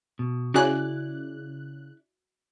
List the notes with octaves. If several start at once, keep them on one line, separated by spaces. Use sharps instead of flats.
B2
C#3 E4 F#4 D5 G#5 F#6